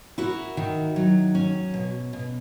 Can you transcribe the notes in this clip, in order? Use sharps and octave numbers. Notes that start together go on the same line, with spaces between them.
E4 F#4 A#4
D#3
F#3
C#4
B2
B2